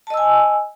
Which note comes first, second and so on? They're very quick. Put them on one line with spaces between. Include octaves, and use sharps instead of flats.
A5 D#5 E6 G#5